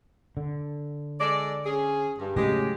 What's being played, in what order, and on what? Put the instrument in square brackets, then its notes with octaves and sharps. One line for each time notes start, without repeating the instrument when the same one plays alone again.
[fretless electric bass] D3
[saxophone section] G#3 A4 D5
C#4 G#4
G2
[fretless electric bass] A2 C#3 F#3 [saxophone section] G#3 G4